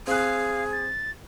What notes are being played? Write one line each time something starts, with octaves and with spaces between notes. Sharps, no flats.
C4 G#4 F5 F#6
A6